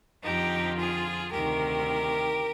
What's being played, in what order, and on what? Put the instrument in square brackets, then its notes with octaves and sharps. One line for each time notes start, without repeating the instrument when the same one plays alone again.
[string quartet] F2 D3 F3 D#4 G4
F4 G#4
D2 C3 D#3 G4 A#4